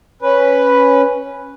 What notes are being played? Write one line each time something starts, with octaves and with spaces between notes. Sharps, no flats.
C#4 B4